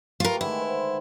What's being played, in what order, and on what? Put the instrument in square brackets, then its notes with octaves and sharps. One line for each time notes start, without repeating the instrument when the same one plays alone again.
[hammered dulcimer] A3 G4 B4 [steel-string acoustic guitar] F4 A#4
[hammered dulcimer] D3 D#3 G#3 [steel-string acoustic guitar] E4
[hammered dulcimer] C5 F#5